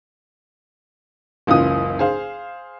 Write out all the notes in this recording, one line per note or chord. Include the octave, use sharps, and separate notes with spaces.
F#1 C#2 E3 F4 D#6
G#4 C5 F5